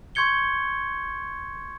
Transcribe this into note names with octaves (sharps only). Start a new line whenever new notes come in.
C6 C#6 G6 G#6 C#7 G7